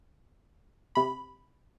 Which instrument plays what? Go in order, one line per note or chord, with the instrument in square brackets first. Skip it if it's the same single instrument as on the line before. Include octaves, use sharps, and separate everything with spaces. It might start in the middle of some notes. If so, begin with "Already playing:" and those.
[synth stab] C3 B5